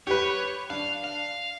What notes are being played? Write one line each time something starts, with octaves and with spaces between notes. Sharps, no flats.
G4 B4 C#5
D4 F5
F5